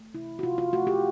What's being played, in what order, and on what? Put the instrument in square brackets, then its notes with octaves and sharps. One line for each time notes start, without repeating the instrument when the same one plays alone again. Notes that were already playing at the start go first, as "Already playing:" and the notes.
Already playing: [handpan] A3
C3 E4
F#4
C3 F4
F4
A3 F#4
G4